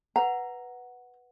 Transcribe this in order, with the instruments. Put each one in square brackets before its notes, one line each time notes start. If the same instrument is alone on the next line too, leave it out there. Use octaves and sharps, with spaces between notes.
[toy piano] B4 F#5 [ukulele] A#5